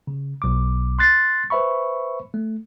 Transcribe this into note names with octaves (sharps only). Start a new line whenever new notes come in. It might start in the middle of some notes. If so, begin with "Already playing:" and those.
C#3
B1 D6
C6 F#6 A6 C7
B4 C5 E5 B5 C#6
A3